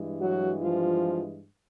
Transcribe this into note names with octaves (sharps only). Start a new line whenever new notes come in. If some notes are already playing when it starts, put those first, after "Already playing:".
Already playing: G2 E3 G#3
F#3 F#4
F3 F4